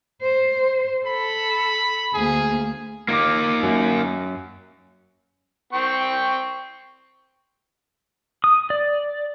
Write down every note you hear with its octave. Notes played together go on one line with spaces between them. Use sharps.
C5
A4 B5
D2 A#3 G#4
A#3 D#4 F4 D6
F#2
C4 G5 C#6
D#6
D5